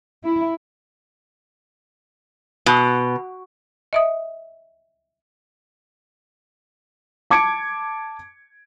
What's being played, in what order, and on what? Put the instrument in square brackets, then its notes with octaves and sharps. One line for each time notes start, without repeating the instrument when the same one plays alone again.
[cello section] E4
[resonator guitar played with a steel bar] B2
[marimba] D#5 E5 D#6
[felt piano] A5 D6 G#6 C#7 D7